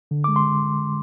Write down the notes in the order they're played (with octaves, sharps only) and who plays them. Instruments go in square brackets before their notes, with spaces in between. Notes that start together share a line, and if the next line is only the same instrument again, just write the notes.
[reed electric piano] D3
D6
G#3
C6